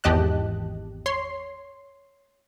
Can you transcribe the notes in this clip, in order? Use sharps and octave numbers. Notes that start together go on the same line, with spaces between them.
G#1 E2 G4 D#5 A5 F#6
C#5 C6 C7